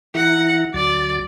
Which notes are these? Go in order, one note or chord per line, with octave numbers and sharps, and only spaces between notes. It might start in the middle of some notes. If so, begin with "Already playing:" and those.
E3 E4 F#5 A#5
D2 F#3 D5 A6